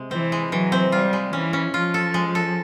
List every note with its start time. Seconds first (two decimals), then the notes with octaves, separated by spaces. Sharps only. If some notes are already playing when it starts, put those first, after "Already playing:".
Already playing: C3 G#3
0.11 E3 C4
0.32 G#3
0.52 E3 F#3
0.72 C4
0.92 G3 F4
1.13 G#3
1.33 E3 C#4
1.53 C#4
1.74 F3 F4
1.94 A4
2.14 G#3
2.35 A4